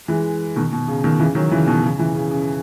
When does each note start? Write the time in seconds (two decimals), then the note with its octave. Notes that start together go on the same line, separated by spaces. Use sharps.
0.08 E3 G#3
0.56 B2 D#3
0.73 B2
0.88 C#3
1.04 B2 D#3
1.20 C#3 E3
1.35 D#3 F#3
1.52 C#3 E3
1.67 B2 D#3
1.83 C#3
1.99 C#3 E3
2.15 C#3
2.31 C#3